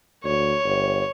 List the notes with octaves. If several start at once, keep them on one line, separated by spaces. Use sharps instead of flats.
D2 C#5
G1